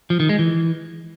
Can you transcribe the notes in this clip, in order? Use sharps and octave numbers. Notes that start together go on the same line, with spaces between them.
F3
D#3
G#3
E3